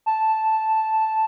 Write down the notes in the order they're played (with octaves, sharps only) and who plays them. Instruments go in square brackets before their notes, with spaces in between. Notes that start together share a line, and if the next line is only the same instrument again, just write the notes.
[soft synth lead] A5